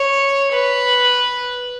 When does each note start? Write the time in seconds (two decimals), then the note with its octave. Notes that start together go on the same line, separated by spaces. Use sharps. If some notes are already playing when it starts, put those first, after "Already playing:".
Already playing: C#5
0.53 B4